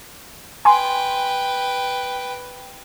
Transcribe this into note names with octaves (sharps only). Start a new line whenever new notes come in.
B4 G5 G#5 C6